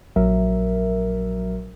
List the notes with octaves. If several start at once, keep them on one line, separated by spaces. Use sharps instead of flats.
A#1 F#3 A#4 E5